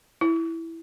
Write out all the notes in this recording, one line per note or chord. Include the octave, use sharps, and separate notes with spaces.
E4